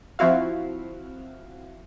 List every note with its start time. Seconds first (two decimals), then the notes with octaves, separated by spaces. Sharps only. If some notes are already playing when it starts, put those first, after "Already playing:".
0.19 F3 C4 E4 F#4 F5